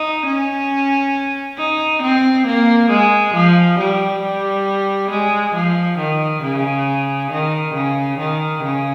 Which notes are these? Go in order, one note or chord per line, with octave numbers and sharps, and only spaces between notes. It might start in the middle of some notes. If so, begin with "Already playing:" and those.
Already playing: D#4
C#4
D#4
C4
A#3
G#3
F3
G3
G3
G#3
F3
D#3
C#3
D#3
C#3
D#3
C#3